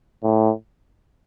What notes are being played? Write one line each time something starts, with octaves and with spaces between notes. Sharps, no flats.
A2